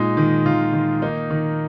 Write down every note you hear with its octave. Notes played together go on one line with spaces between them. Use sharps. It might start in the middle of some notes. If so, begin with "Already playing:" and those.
Already playing: A#2 G#3 D#4
D#3
D#3 F4
D#3
A#3 D#4
D#3